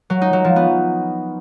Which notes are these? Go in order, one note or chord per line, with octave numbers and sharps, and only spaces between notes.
F#3
D#4
F#3
F3
B3